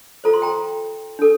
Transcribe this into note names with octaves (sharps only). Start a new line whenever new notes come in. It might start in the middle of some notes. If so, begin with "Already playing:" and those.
F4 A4 C5 A#5
C6
G5 A#5
D4 A4